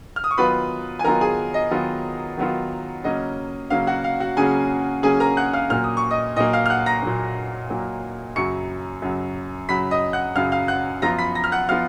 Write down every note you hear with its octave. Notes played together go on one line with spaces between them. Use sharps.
F6
D#6
C#6
D#3 F#3 B3 F4 B4 B5
G#5
D#3 F#3 B3 F4 A#4 A#5
G#4 G#5
D#5
D#3 F#3 B3 F4
D#3 F#3 B3 F4
C#3 F#3 A#3 C#4 D#5
C#3 F#3 A#3 C#4 F5
F#4 F#5
F5
F#4 F#5
C#3 F#3 A#3 C#4 G#4 G#5
C#3 F#3 A#3 C#4 G#4 G#5
A#4 A#5
F#5 F#6
F5 F6
A#2 F#3 A#3 F6
D#6
C#6
D#5 D#6
A#2 F#3 A#3 D#5 D#6
F5 F6
F6
F#5 F#6
A#5 A#6
A#2 F#3 A#3
A#2 F#3 A#3
F#2 C#3 F#3 C#6 C#7
F#2 C#3 F#3
F#2 C#3 F#3 B5 B6
D#5 D#6
F#5 F#6
F#2 C#3 F#3 F5 F6
F5 F6
F#5 F#6
F#2 F3 B3 F4 A#5 A#6
B5 B6
A#5 A#6
F6
F#5 F#6
F3 B3 F4 F5 F6